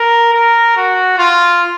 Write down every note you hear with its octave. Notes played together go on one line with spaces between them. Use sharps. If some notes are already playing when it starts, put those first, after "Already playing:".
Already playing: A#4
A#4
F#4
F4